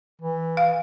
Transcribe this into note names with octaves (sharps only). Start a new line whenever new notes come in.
E3
F5